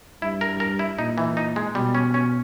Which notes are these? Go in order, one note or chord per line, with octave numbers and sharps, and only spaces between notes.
G2 E4
A#4
A#4
E4
A#2 D#4
E3
D#4
G#3
B2 G3
C#4
C#4